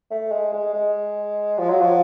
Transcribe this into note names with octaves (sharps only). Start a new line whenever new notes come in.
A3
G#3
G#3
G#3
F3
F#3
F3